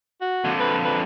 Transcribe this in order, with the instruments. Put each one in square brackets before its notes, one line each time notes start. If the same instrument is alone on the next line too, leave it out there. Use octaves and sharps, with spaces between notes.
[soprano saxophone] F#4
[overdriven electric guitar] F2 D3
[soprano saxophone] B4
B4